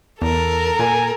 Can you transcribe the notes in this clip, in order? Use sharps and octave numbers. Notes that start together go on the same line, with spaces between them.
E2 A4 A#4
A#2 G#5